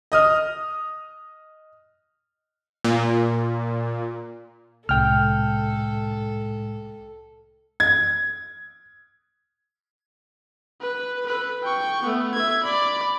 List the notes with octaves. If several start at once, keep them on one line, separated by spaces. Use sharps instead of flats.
D#5 D#6 F6
A#2
C2 A2 G#3 A4 G5 F6
G#6
B4
A4 B4
G5 C#6
A3 B3
E5 G#6
D5 B5